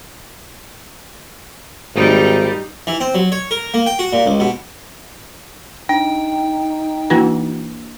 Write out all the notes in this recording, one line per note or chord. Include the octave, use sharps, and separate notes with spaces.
G#1 G3 D#4
E3
C4
F#3
C#5
A#4
A#3
G5
F#4
A#2
C#2
B2
D4 D#4 G5
E3 A#3 D4 F#4 B4